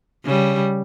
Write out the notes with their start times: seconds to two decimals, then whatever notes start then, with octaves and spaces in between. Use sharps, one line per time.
0.25 C#3 G3